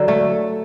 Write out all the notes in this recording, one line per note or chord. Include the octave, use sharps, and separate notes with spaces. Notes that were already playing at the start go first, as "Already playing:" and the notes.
Already playing: D3 F#3
A3